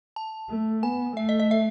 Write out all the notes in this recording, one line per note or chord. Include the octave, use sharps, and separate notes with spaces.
A5
A3
B3 G#5
A3 E5
D#5
D#5
E5